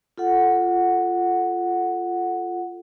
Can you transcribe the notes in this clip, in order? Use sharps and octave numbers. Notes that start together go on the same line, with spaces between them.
F4 A4 F#5